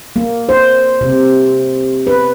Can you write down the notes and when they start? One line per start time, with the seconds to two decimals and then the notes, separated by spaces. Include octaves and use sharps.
0.16 A#3
0.49 C5
1.01 C3
2.07 B4